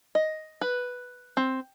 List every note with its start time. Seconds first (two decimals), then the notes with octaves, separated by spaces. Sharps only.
0.15 D#5
0.61 B4
1.37 C4